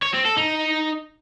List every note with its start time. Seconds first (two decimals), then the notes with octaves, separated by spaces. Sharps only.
0.02 C#5
0.14 C4
0.25 A4
0.37 D#4